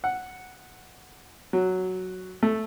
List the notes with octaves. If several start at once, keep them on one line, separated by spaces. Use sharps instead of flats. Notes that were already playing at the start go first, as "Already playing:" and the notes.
F#5
F#3
A3